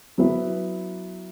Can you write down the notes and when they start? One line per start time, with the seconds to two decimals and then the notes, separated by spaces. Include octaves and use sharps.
0.18 F#3 B3 E4 B4